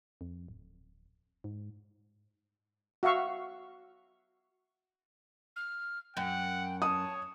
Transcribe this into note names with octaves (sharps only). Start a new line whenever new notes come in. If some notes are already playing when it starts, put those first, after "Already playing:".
F2
D1
G#2
F#4 E5 F5 C#6 E6
F6
F#2 F#5 G5
C#5 A5 D#6